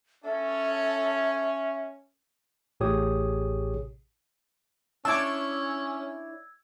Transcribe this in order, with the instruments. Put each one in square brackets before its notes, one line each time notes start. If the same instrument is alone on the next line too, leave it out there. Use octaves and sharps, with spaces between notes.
[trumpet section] C#4 [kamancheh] A4 [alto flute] E5
[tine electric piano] A1 A2 G4 G#4 C#5 D#6
[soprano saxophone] C#4 [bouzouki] D4 E4 C#5 [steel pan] A5 D6 [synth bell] E6 G#6